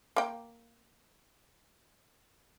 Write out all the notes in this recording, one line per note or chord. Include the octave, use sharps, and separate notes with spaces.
A#3 G5